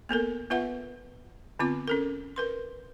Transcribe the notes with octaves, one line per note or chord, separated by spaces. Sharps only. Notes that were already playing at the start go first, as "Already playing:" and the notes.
A#3 B3 A4 A#4
B3 F4 B4 E5 F#5
D3 B3 C4 F4 D6
C#4 A4 A#4
A#4 B4 C6